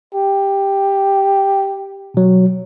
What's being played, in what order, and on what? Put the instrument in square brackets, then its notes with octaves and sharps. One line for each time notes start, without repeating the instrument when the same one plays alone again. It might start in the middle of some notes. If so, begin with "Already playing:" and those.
[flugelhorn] G4
[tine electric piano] B2 F#3